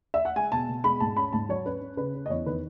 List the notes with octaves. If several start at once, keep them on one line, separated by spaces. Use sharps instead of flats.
E5
F#5
G#3 G#5
B2 A5
B2
G#3 B5
G#2 A5
C#4 B5
G#2 A5
F#3 C#5
C#4 B4
C#4
C#3 B4
C#4
D#5
E2 C#5
D#3 B4